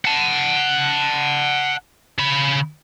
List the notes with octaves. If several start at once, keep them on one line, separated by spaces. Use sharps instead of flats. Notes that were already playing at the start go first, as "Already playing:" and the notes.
F#5 A5
C#3 B5